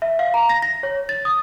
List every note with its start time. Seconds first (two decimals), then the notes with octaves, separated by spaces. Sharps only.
0.02 E5
0.19 F5
0.34 A#5
0.49 A#6
0.62 A#6
0.83 C#5
1.09 A6
1.25 D#6